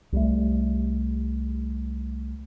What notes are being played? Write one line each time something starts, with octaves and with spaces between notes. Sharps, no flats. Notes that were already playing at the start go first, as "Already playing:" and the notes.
C2 G3 A3